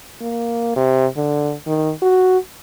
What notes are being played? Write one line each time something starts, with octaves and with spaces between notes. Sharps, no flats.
A#3
C3
D3
D#3
F#4